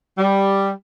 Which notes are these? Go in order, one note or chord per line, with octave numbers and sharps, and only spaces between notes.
G3